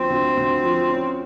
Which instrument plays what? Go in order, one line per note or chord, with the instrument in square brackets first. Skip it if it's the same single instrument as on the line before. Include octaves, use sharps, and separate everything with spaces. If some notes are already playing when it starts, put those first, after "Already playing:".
Already playing: [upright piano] D2 F3 [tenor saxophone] C4
[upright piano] D2
D2
F3
C#4